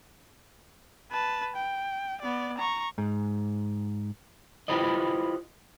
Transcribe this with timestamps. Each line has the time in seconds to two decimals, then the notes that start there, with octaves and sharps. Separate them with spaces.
1.12 B4 A5
1.56 G5
2.21 B3 D5
2.58 A#5 C#6
2.98 G#2
4.68 E4 F4 G4 B4 C5 D#5